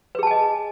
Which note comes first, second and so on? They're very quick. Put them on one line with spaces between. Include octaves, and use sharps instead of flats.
B4 G#4 A5 G#5 D#5